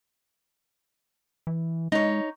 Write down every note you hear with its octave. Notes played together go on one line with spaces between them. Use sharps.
E3
G#3 D#4 C#5